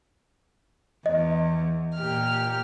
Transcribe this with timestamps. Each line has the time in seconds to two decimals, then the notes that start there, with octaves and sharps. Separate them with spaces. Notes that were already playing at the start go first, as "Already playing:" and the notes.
1.06 E2 D#5
1.96 A#2 G4 F6